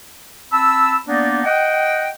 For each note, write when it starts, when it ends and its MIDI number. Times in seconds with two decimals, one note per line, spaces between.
0.52 0.96 60
0.52 0.96 81
0.52 0.96 83
0.52 0.96 88
1.08 1.42 58
1.08 1.42 59
1.08 1.42 62
1.08 1.42 63
1.08 1.42 74
1.44 2.10 75
1.44 2.10 78
1.44 2.10 79